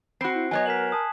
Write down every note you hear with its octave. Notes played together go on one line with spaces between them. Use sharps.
C4 F#4 B5 F#6 C7
E4
F#3 B3 C#5 D#5 G#5 F#6 G#6
A#4 B6 E7 F#7
A5 D#6